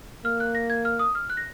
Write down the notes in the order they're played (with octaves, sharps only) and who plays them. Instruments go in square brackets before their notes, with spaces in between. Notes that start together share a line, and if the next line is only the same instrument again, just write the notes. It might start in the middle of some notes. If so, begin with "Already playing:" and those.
[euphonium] A#3 [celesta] F6
[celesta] F#6
A#6
G#6
F6
D#6
F6
F#6
A#6